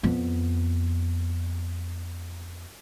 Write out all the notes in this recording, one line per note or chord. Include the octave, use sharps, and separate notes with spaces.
F2 B3